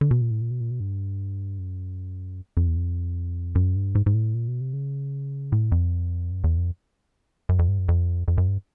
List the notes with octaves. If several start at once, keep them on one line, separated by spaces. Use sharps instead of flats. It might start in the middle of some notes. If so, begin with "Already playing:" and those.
D3
B2
A#2
A2
A#2
B2
A#2
B2
G2
F#2
F2
E2
F2
F#2
G2
G#2
G#2
A2
A#2
B2
C3
C#3
A2
F2
F#2
E2
F2
F#2
F2
G2
F#2
F2
F2
F#2
G2